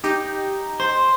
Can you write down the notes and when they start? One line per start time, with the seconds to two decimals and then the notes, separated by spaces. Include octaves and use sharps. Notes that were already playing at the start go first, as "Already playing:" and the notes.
0.04 D#4 G4
0.80 C5